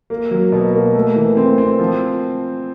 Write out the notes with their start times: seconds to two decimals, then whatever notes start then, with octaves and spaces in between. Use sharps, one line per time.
0.10 A#3
0.31 F#3
0.52 B2
0.74 A#3
0.94 A3
1.16 E3
1.37 C4
1.58 C4
1.79 F3